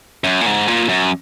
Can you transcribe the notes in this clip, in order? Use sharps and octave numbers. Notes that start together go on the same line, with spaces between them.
F#2
A#2
G#2
A#2
F#2